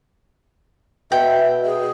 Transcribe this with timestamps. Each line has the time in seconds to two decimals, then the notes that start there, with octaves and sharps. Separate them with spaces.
1.12 B2 E5 G5
1.65 G#4